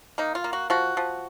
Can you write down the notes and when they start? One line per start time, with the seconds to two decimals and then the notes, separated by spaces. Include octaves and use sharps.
0.18 A#3 D#4
0.35 F4
0.44 A#3
0.53 F#4
0.70 F3 F#4
0.97 F3